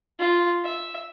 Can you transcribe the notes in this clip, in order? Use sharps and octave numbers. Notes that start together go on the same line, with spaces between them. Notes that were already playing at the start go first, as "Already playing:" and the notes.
F4
E5